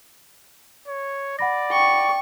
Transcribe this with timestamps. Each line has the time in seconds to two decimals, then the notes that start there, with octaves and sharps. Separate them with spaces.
0.88 C#5
1.39 D5 F#5 B5 A#6
1.72 G5 C#6